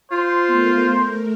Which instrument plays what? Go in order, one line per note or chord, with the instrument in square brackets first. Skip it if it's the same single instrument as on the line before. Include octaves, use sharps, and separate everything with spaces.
[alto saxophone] F4 [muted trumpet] C5
[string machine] A3 A#4 [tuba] B3